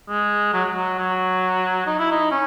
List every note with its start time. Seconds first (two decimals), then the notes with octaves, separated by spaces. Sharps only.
0.09 G#3
0.54 F#3
0.74 F#3
0.99 F#3
1.87 D#4
1.99 E4
2.11 D#4
2.31 C#4